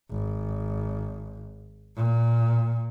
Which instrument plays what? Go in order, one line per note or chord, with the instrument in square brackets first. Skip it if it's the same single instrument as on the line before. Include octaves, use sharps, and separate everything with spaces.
[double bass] G#1
A#2